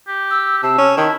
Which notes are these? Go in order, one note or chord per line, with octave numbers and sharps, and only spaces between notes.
G4
E6
C3 A5 E6
C#4
D#3 E4